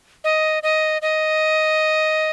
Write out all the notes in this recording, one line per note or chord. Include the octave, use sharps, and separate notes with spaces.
D#5
D#5
D#5